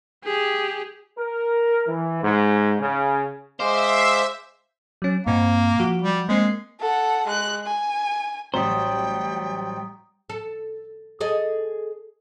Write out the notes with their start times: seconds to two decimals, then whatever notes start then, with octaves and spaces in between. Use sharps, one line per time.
0.24 G4 G#4
1.17 A#4
1.87 E3
2.22 G#2
2.79 C#3
3.60 G#3 C5 E5 F5 D6
5.02 F#3 C#4
5.27 G2 A#2 A#3 C4
5.79 F3 F#4
6.02 G3
6.29 G#3 A#3 C4 C7
6.80 A4 F#5
7.27 G#3 F#6
7.66 G#5
8.54 A1 F#3 G3 C5 G5 A#5 D#6
10.30 A4
11.21 G#4 A4 D#5